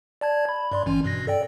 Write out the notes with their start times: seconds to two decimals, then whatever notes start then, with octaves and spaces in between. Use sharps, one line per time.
0.21 D5 A5 G#6
0.49 B5
0.72 G2 D5 C6
0.86 G#1 E3 C#4
1.04 G2 B2 A#6
1.27 A4 D5 G5